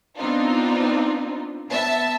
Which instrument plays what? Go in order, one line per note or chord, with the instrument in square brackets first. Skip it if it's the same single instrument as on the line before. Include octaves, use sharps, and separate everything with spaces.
[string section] B3 C4 D4 D#4 F4
B3 E5 A5